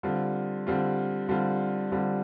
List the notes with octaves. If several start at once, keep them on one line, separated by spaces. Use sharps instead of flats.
D3 G3 C4 F4
D3 G3 C4 F4
D3 G3 C4 F4
D3 G3 C4 F4